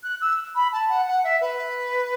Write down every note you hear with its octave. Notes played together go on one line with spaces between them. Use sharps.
F#6
E6
B5
A5
F#5
F#5
E5
B4